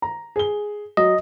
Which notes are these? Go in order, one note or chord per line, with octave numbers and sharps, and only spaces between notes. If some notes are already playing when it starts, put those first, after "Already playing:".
A#5
G#4 G7
F#3 D#5